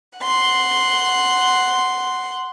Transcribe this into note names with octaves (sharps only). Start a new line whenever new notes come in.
F#5 C6